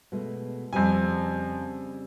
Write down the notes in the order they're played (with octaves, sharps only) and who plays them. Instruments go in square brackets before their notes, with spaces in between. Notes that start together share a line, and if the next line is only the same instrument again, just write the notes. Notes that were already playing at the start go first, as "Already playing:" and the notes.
[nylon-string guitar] B2 G#3 A3
[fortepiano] F2 G#5 [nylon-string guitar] C#3 G3 C4